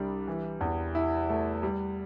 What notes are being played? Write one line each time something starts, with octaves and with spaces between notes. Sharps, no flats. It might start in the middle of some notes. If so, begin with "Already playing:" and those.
Already playing: C2 G3 D4
E3
E2
E4
A3
G3